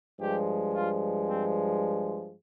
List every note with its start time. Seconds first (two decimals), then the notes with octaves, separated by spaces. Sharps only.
0.18 G2 F3 G#3 G4
0.73 F4
1.27 C4